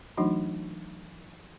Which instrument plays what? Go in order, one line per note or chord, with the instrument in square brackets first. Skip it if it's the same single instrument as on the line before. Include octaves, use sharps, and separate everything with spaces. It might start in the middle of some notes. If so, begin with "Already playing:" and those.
[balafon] E3 F#3 A3 D4 D#4 F#4